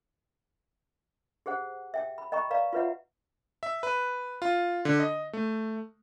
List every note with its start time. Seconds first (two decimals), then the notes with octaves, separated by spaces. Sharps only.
1.46 G4 G#4 C5 F#5
1.94 E5 G5
2.18 B5
2.32 D#5 G5 A#5 B5 C#6
2.50 B4 D5 F5 A#5
2.73 F4 F#4 B4 C#5 E5 F#5
3.63 E5
3.83 B4
4.42 F4
4.85 D3
4.99 D#5
5.33 A3